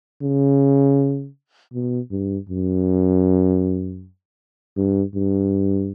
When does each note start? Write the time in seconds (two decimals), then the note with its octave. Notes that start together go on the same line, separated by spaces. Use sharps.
0.22 C#3
1.74 B2
2.11 G2
2.49 F#2
4.77 G2
5.15 G2